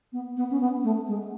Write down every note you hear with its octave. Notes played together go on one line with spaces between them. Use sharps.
B3
B3
C#4
B3
A3
G#3